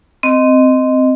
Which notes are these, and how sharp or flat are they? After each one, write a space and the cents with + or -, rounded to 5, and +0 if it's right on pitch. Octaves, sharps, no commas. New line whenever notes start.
C4 -10 D#5 +0